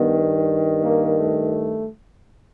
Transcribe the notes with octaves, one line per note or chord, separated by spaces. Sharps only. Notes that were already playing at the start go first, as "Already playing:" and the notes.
Already playing: G2 D#3 B3
A#3
A3